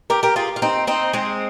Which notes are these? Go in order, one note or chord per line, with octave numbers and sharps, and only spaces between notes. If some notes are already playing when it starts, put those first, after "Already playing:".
G4 A#4
G4 A#4
F4 G#4
F4
C4 D#4
C4 D#4
G#3 C4